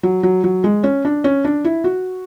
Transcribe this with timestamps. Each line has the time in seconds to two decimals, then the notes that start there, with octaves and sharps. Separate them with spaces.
0.03 F#3
0.23 F#3
0.44 F#3
0.64 G#3
0.84 C#4
1.05 D4
1.24 C#4
1.45 D4
1.64 E4
1.84 F#4